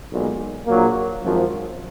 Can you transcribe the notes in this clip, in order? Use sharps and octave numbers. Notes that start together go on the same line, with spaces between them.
B1 A#2 G#3
A#1 A#2 F#3 A#3
G#1 F#2 F3